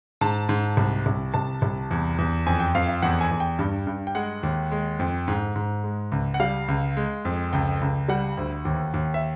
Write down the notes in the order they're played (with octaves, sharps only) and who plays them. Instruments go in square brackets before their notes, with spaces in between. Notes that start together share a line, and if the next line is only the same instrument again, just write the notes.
[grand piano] G#2 A5
G#2
C2
C2
C2 A5
C2
E2
E2
F2 G#5
G5
F2 F5
F5
E2 F#5
G#5
E2
G5
G2
G2
G5
G#3 F#5
D#2
G#3
F2
G#2
G#2
G#3
C#2
F#5
G3 F5
C#2
G#3
F2
C#2 G5
C#2
G3 F#5
D2
D#2
D#2
E5